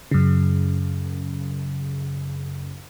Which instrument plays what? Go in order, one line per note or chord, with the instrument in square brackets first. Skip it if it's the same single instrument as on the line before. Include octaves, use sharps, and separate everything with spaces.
[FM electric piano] F#2 C#3